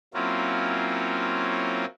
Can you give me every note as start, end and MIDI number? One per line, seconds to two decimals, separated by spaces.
0.14 1.85 54
0.14 1.85 58
0.14 1.85 60
0.14 1.85 61
0.14 1.85 64
0.14 1.85 65